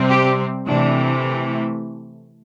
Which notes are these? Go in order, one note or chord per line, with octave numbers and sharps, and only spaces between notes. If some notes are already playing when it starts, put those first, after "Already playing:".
Already playing: C3 G3 C4
G4
C3 E3 A3 D4